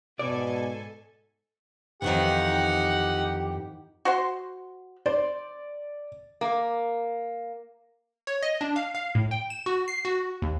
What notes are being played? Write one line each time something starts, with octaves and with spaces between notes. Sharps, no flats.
G#2 B2 A4 D5 G#5
F2 D#3 E3 D#4 G4 F#5
F#4 C5 C6
C5 D5
A#3
C#5
D#5
D4
F5
F5
A2
G5
E7
F#4
C7
F#4
D#2